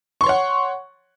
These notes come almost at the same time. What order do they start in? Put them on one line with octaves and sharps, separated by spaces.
C#6 C6 C#5 F#5